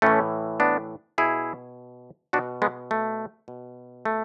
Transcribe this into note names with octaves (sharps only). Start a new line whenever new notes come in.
A2 E3 A3 C#4
B3 D4
B2 E4 G#4
B2 D4 F#4
G#3 B3
A3
B2
A3